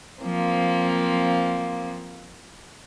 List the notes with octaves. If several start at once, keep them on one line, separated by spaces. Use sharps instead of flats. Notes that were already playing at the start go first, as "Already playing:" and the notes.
F3 A#3 C4